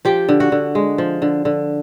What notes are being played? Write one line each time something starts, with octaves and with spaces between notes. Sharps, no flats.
F3 G4 G5
D3
F#4 F#5
D3
G#3
F3
D3
D3